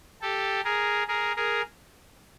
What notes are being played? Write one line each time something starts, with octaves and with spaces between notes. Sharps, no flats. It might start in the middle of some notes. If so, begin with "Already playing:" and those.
G4 A4
G#4 A#4
G#4 A#4
G#4 A#4